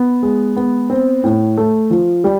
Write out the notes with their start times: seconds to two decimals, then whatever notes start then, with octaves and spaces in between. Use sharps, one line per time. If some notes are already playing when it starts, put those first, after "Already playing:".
Already playing: B3
0.23 G#3
0.56 B3
0.90 C4
1.24 A2
1.57 A3
1.90 F3
2.24 G3